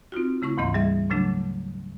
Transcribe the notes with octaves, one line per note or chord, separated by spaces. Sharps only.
C4 D#4 F4 F#4
C#3 A3 E4 C#6
D2 G#2 E3 A#3 D#5 C6
G3 G#4 E5
A#2 C#3 F#3 A3 D4